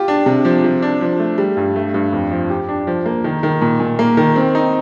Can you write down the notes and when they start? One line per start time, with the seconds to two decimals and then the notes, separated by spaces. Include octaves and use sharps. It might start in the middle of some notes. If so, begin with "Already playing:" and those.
Already playing: F4 G4
0.08 D4
0.26 C3
0.45 F3
0.64 F3
0.82 D4
1.01 F3
1.19 A3
1.38 G3
1.57 G2
1.76 A3
1.94 G2
2.12 F2
2.31 F3
2.50 G4
2.69 D4
2.87 F3
3.06 A#3
3.24 D#3
3.43 D#3
3.61 A#2
3.80 A#2
3.99 A#3
4.17 D#3
4.36 C4
4.55 D#4